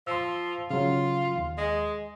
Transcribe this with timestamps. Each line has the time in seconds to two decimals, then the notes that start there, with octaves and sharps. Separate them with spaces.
0.07 F3 C6 E6
0.70 C#3 F#3 F4
1.36 D#2
1.58 G#3